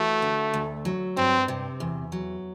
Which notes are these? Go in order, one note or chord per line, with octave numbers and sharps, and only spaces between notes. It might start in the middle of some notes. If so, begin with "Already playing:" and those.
Already playing: E3 A3 F#4
D3
D2
F#3
G2 C4
C3
E2
F#3